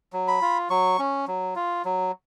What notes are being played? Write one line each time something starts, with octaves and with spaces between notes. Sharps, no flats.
F#3
B5
F4
F#3 C#6
C#4
F#3
F4
F#3